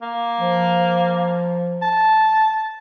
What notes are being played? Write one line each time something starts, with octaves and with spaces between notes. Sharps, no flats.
A#3
F3
A5